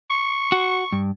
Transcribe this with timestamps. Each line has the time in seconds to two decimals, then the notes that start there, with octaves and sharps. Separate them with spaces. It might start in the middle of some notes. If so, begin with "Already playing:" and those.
0.10 C#6
0.52 F#4
0.92 G2